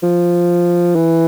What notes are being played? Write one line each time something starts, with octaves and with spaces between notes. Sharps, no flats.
F3
E3